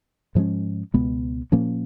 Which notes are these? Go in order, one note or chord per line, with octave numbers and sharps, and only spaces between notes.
G#2 F3 G#3 C#4
C#2 B2 G#3 B3
A#2 F3 A#3 C#4